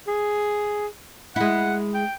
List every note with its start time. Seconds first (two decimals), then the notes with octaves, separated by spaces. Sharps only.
0.08 G#4
1.36 G#3 E4 F#5
1.95 G5